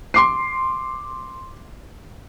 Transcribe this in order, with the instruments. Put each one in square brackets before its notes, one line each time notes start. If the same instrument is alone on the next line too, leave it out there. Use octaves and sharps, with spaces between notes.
[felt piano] C6 D6 C7